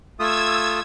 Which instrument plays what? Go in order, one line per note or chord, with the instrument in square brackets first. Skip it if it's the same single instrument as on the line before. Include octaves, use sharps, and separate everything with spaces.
[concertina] A3 F4 D#6 [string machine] E6 G#6